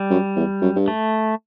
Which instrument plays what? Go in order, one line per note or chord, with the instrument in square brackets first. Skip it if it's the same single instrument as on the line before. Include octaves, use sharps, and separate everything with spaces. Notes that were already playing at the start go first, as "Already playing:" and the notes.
Already playing: [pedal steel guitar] G3
[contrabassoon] F#2
E2
F#2
G2
[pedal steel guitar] A3